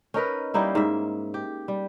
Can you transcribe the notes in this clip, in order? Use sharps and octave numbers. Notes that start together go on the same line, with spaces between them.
C#4 D#4 A#4 B4
G3 A#3 D#4 E4
G#2 E5
G4
G3